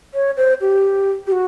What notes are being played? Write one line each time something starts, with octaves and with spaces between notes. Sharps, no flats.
C#5
C5
G4
G4
F#4